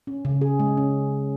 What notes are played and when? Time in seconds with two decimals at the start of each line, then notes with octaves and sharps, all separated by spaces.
0.07 C#4
0.25 C#3
0.41 G#4
0.60 G#3
0.77 C#4